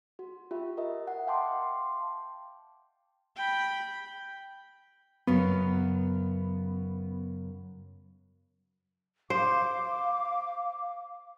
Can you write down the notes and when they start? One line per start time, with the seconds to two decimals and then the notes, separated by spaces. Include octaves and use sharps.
0.19 F#4
0.51 F4 G4 E5
0.77 A#4 D#5 E5
1.07 F#5
1.27 F5 G5 A5 C6 D6
3.37 G5 B5
5.27 F#2 C#3 F#3 B3
9.30 C5 F5 D6